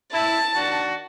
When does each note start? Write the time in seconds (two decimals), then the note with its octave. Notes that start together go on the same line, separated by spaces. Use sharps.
0.12 E4 A5
0.55 D#3 D4 F#4